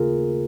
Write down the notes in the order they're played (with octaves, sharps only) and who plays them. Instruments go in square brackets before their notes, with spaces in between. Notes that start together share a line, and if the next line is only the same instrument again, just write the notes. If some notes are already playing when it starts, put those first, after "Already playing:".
Already playing: [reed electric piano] D#2 C#3 A#3 F4 G#4 A#4